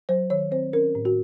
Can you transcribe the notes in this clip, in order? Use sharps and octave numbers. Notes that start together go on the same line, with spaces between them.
F#3 C5
D#3 C#5
C4 C5
C#4 A#4
A2
F#4